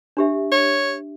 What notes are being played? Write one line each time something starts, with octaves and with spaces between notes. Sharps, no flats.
D4 G4 E5
C#5